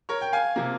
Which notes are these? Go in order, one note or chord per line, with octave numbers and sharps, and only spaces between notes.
A#4 C#5
G5
F5 G#5
C3 F3 A#3